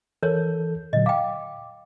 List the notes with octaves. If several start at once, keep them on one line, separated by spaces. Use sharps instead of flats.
E3 A4 A#4 C#5 G6
A#2 D3 F#3 D#5
F5 G5 D6